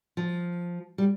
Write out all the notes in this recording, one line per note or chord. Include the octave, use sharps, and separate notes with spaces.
F3
G3